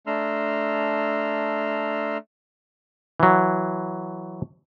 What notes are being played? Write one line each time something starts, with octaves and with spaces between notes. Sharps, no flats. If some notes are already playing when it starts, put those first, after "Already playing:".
A3 D4 A#5 C6 E6 F6
E3 F#3